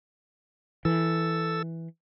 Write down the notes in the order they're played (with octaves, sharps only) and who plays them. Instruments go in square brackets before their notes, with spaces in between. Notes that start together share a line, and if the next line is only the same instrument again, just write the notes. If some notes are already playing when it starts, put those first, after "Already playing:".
[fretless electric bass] E3 [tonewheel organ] A4 E6